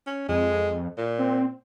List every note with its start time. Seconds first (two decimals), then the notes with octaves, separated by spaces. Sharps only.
0.07 C#4
0.29 F2 G#3
0.98 A#2
1.19 C4